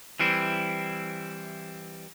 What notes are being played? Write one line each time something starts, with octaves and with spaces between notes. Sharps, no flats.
E3 G3 C4 E4